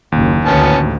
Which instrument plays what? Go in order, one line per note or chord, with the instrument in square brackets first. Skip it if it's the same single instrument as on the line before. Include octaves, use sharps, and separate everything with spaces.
[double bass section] F#1 [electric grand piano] D#2
[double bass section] A1 D2 [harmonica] B3 C#4 A5